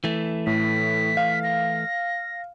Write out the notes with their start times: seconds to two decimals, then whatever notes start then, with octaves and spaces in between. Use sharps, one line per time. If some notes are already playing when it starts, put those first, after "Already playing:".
0.04 E3 A3
0.47 A2 B6
1.17 F5
1.43 A#6